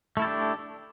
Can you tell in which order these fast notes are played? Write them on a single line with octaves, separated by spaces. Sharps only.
A3 E4 A4 G4 D4